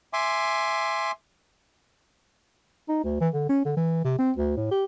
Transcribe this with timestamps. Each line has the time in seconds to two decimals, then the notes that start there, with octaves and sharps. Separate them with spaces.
0.13 E5 G#5 C6 D6
2.89 D#4
3.04 D2
3.20 E3
3.34 D3
3.49 C#4
3.65 D3
3.77 E3
4.04 C3
4.19 C4
4.37 D2
4.57 A2
4.71 G4